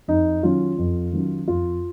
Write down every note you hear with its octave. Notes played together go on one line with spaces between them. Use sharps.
F2 D#4
D#3 F#3 C#4 F4
F2
D#3 F#3 C#4
F2 F4